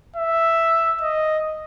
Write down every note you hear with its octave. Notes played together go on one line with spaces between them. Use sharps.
E5
D#5